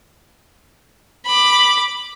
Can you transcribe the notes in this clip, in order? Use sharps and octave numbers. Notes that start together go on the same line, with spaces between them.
B5 D6